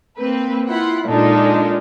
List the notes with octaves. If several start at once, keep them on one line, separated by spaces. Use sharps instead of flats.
A#3 C4 B4
E4 F4 F#5 B5 C6
A#2 G#3 D4 D#4 F4 A4